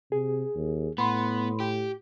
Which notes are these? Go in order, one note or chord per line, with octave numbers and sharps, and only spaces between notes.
C3 G#4
D#2
A2 B3 B5 C6
G4